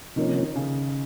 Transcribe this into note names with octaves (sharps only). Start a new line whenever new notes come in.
C3 D#3 F3 A#3 C#4
C#3